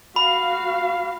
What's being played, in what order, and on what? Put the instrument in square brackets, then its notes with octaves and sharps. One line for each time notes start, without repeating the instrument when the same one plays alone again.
[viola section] F#4 F5 [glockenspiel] B5